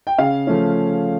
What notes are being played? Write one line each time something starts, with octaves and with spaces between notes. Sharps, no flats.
G5
C#3 F5
F3 A3 C#4